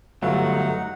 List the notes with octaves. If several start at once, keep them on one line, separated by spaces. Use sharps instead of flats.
G1 F#3 A3 D#4 F#5